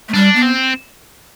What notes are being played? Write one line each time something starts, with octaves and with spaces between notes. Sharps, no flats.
A3
G3 D4
B3
C4